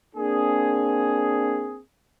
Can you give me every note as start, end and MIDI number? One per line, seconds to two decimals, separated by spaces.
0.16 1.79 58
0.16 1.79 60
0.16 1.79 62
0.16 1.79 68